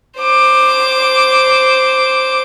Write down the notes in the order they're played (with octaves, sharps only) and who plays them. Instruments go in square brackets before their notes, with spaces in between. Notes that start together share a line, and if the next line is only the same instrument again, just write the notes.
[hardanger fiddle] C5 D6